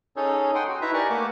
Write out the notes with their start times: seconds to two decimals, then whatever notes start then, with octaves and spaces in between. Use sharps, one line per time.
0.16 C#4 D#4 G#4 A4 C#5
0.55 F#5 G5 C6 D#6
0.68 F#4
0.81 D#4 E4 B4 E5 A#5
0.94 G4 A#4 D5 G#5 A#5 C#6
1.09 A3 A#3 F#5 D6